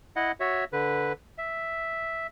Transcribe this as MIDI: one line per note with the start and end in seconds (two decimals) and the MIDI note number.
0.16 0.32 64
0.16 0.32 75
0.16 0.32 78
0.40 0.64 66
0.40 0.64 73
0.40 0.64 76
0.73 1.13 50
0.73 1.13 71
1.38 2.27 76